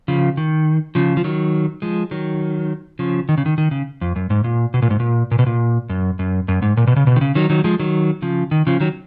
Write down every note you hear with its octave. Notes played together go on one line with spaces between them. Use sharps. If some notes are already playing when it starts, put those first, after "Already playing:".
C#3 F3
D#3
C#3 F3
F3
D#3 F#3
F3 G#3
D#3 F#3
C#3 F3
D#3
C#3
D#3
D#3
C#3
F2
F#2
G#2
A#2
B2
A#2
G#2
A#2
A#2
B2
A#2
F#2
F#2
F#2
G#2
A#2
B2
C#3
B2
D#3
C#3
D#3 F#3
D#3 F#3
F3 G#3
D#3 F#3
C#3 F3
D#3
C#3 F3
D#3 F#3